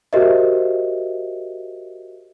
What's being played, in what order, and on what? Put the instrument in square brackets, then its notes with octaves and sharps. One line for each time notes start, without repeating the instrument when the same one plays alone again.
[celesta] F#4 G4 A#4 C5 D#5 E5